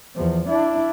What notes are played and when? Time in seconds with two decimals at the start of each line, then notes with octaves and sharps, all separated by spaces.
0.16 E2 F3
0.49 D4 E4